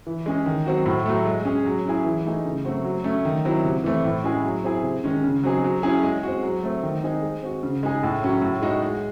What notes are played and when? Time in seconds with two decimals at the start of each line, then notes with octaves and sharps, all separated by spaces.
0.07 E3
0.26 G#3 C#4 G#4
0.46 D#3
0.66 F#3 C4 F#4
0.86 A2
1.06 F#3 A3
1.26 G#3
1.45 C#4 G#4
1.66 F#3
1.85 C#4 E4 G#4
2.05 E3
2.25 A3 D#4 G#4
2.45 C#3
2.64 F#3 A3 C4 F#4
2.84 F#3
3.04 A3 C#4
3.25 D#3
3.45 F#3 C4 E4
3.64 C3
3.84 E3 A3 C4
4.04 A2
4.24 G#3 C#4 E4 G#4
4.44 F#3
4.64 C4 E4 G#4
4.83 C3
5.04 D#3 G#3 C#4
5.24 C#3
5.43 F#3 C4 D#4 G#4
5.64 F#3
5.83 C#4 E4 G#4
6.03 G#3
6.23 C4 F#4
6.43 F#3
6.63 A3 C4
6.83 D#3
7.03 G#3 C4 D#4 G#4
7.23 G#3
7.42 C4 F#4
7.63 C#3
7.83 G#3 D#4 G#4
8.03 A2
8.23 F#3 C#4 F#4
8.42 A2
8.62 G#3 D#4 F#4
8.83 G#3